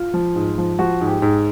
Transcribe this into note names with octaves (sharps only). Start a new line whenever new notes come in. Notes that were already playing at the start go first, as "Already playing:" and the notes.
Already playing: F4
F3
G#2
F3
F3 F#4
G#2
G4
G#2